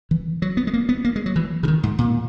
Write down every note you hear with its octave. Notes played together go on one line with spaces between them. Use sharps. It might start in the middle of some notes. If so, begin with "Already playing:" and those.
E3
F#3
B3
G#3
A#3
B3
A#3
G#3
F#3
E3
C#3
D#3
G#2
A#2